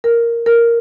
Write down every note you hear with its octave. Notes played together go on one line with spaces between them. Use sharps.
A#4
A#4